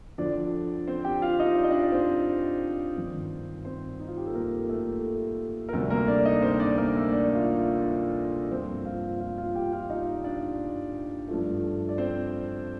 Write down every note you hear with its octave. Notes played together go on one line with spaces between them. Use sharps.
F2 D3 F3 C4 D4 D5
C4 C5
G4 G5
F4 F5
D#4 D#5
D5
D#5
D4 D5
C4 C5
G2 D#3 G3 C4
C4 C5
D#4
F4
G4
A4
A#3 A#4
A3 A4
A#4
D2 C3 G3 A3 A4
A#3 A#4
D4 D5
D#4 D#5
C4 C5
D4 D5
A#3 A#4
A3 A4
D4 D5
F4 F5
D4 D5
G2 F3 A#3 C4 C5
F4 F5
F4 F5
F4 F5
G4 G5
F4 F5
D#4 D#5
D4 D5
G2 F3 A3
D5
C4 C5